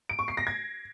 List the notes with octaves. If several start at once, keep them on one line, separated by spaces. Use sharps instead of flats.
D7
C#6
C7
A#6
G#6